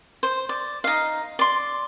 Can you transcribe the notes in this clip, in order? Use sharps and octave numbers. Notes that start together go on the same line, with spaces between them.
C5
D5
D#4 F5
D5 C6